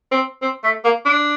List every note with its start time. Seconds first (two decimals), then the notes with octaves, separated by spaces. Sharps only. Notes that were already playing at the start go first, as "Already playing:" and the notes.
0.12 C4
0.42 C4
0.64 A3
0.84 A#3
1.05 D4